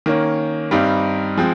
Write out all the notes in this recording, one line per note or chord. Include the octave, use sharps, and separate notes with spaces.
D#3 A#3 C#4
G2 G3 C4 D#4
F3 G#3 C4